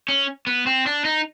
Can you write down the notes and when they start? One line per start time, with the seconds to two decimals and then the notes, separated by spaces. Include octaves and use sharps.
0.08 C#4
0.47 B3
0.66 C4
0.86 D4
1.05 D#4